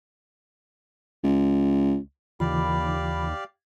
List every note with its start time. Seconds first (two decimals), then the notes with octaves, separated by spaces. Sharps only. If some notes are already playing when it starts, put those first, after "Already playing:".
1.24 C#2
2.40 D#2 C#3 E3 F4 G4 D5 F5 B5